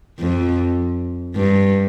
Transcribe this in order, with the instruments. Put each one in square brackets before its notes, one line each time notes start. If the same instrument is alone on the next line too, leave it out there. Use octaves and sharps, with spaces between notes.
[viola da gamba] F2
G2